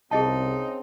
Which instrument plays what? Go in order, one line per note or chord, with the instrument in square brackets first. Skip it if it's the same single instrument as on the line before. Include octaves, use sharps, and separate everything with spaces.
[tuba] C2 [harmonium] C#3 C4 [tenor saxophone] D#4 [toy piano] G#4 D#5 A5